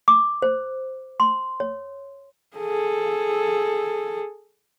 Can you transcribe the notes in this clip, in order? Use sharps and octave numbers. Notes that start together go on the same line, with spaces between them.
D6
C5
C6
C#5
G#4 A4